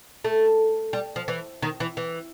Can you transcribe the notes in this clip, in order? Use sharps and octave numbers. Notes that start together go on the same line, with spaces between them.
A3
G3
F3
E3
D#3
E3
E3